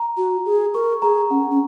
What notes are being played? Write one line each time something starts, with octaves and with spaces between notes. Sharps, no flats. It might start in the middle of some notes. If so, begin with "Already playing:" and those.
Already playing: A#5
F#4
G#4
A#4 C#6
G#4 A#5
C#4 F#5
C#4